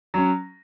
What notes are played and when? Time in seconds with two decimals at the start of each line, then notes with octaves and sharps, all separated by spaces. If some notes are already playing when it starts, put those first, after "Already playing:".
0.14 F#3 C#4